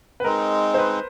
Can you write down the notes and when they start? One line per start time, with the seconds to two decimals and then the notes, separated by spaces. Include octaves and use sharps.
0.20 B4
0.24 G#3 C4 D#4 A#4
0.74 C5
0.78 B4